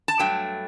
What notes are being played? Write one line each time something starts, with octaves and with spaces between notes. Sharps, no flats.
A5
G2 F#3 A3 G5